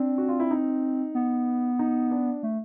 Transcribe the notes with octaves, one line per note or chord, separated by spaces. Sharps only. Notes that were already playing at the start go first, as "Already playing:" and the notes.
Already playing: C4 D4
F#4
F4
E4
D#4
B3
D#4
D4
A3